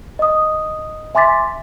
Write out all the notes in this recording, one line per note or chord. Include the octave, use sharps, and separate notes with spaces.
D#5 D#6
E5 G#5 C6 D6 A6 B6